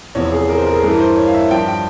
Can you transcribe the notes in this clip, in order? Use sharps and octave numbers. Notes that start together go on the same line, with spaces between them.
E2 C3 F3 C#5
G#4
A#4
C5
A#4
G#4
G2 E3 A#4
C5
C#5
F5
E5
G2 F3 G5
G5